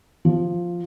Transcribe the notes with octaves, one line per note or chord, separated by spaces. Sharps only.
F3